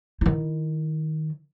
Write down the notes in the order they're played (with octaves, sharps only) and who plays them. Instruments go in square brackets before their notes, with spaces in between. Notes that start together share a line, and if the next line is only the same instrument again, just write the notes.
[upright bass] D#3 E4